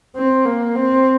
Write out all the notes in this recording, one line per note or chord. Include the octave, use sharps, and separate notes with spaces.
C4
A#3
C4